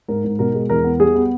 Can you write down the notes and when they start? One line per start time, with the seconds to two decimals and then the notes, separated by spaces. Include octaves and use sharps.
0.08 G#2 A#4
0.24 G#2
0.39 B2 A#4
0.55 G#3
0.70 E2 A#4
0.84 B3
1.00 G3 G#4
1.16 B3